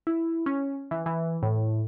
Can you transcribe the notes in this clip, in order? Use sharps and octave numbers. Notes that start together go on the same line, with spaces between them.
E4
C#4
E3
E3
A2